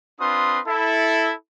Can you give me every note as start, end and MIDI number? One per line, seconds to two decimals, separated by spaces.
0.20 0.60 60
0.20 0.60 62
0.20 0.60 65
0.20 0.60 71
0.20 0.60 84
0.20 0.60 87
0.66 1.32 64
0.66 1.32 69